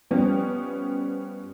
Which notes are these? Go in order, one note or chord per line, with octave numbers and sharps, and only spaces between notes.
F3 G3 B3 C#4